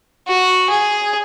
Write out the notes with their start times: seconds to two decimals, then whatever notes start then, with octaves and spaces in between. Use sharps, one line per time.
0.28 F#4
0.70 G#4